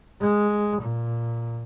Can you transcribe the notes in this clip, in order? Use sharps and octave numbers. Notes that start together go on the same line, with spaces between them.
G#3
A#2